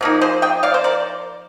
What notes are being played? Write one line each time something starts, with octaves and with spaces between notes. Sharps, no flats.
C3 F3 A#3 D#4
G#4 C5
D#5 G5
D5 F5
C5
A#4 D5